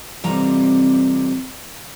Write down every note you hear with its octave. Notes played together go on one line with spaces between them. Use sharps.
F2 C3 E3 G3 A#5